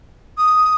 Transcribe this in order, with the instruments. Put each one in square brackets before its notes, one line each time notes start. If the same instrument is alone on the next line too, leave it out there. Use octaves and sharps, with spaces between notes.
[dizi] D#6